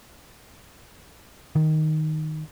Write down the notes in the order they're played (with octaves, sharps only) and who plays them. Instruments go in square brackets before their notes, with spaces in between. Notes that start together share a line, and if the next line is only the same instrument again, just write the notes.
[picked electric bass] D#3